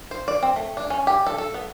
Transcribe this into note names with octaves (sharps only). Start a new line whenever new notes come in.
C5
D5
C4
A3
D4
C#4
G4
A4
A4
B3